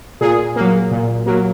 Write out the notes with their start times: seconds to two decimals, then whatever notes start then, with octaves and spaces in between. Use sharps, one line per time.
0.21 A#2 G#4
0.56 F#3 A#3
0.91 A#2
1.26 F#3 A#3